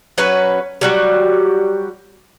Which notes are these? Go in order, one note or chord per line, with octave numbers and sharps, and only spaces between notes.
F#3 C#4 B4 F#5
F#3 G3 F#4